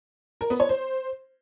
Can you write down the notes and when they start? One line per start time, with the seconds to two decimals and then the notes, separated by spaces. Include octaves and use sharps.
0.41 A#4
0.50 B3
0.60 C#5
0.69 C5